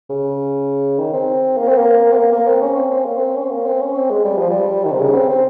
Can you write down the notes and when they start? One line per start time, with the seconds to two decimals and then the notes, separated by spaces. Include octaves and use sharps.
0.10 C#3
0.99 D#3
1.13 C4
1.57 A#3
1.68 C4
1.79 A#3
2.13 C4
2.17 A#3
2.32 A#3
2.47 C4
2.61 C#4
2.76 C4
2.91 C4
3.05 A#3
3.18 C4
3.36 C#4
3.43 C4
3.51 A#3
3.66 C4
3.81 C#4
3.95 C4
4.10 G#3
4.24 G3
4.38 F3
4.51 G3
4.85 D#3
4.92 C3
4.99 C#3
5.15 C4
5.29 C4